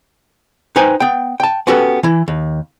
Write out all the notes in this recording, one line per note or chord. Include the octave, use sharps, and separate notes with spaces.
D#4 B4 C5 G5 G#5
B3 G5
G5 A5
B3 C#4 F#4 G4 A4 B4
E3 E4
D#2